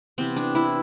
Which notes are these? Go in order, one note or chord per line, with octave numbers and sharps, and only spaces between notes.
C3 E3 B3 C4
D4
E4